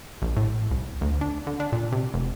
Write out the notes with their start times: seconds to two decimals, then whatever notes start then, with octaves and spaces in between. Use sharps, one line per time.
0.22 A#1
0.37 A2
0.71 C2
1.01 D2
1.21 D4
1.47 D3
1.60 D4
1.72 A#2
1.92 C3
2.14 F1